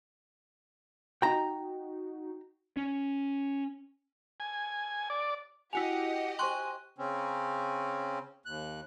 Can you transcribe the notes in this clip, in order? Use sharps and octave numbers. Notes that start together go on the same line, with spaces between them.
D#4 F#4 G5 A#5
C#4
G#5
D5
E4 F#4 G4 D#5 F#5 G#5 F7
C5 G5 G#5 C6 C#6 F#6 F#7
C#3 C4 C#4
D#2 F#6